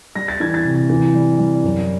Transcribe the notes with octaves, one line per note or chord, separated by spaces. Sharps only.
G3 A#6
A6
E3 G#6
A6
C3
E3
G3
G3
F#2